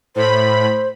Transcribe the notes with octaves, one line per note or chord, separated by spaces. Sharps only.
A2 C5 B5